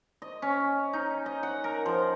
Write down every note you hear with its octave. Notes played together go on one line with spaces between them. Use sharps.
D#5
C#4
D#4
D#5
F#5
A#4
F3